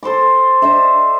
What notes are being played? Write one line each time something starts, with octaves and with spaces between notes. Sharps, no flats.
A4 C5 C6 D6
D4 C5 D#5 E5